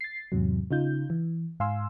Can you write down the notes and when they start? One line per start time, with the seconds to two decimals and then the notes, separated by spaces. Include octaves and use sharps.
0.01 A6 C7
0.32 E2 G#2 C3 F#3
0.71 C#3 D#4 F4 G6
1.10 E3
1.60 G#2 F5 G#5 C6 E6